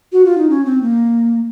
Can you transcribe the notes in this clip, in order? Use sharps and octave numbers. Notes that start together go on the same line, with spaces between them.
F#4
F4
D#4
C#4
C4
A#3